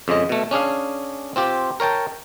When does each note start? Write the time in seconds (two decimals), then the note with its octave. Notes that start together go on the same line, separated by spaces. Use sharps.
0.08 F2 C#3 G#3 D#5
0.29 B2 A3
0.51 C#4 D4 G#4 F5
1.36 C4 F4 G4
1.80 A#4 C#5 G5 A5